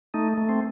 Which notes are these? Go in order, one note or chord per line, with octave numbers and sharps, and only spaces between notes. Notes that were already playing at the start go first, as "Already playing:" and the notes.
A3 D#4
A3
C4